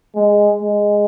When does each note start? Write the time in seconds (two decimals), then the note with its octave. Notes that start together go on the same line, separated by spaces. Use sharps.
0.15 G#3
0.62 G#3